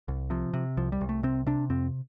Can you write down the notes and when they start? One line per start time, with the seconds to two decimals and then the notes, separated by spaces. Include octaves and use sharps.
0.08 C2
0.30 C3 F3
0.53 C3
0.77 C2 F3
0.92 G3
1.01 C2
1.09 A3
1.23 C3 C4
1.46 C3 D4
1.70 F2 C4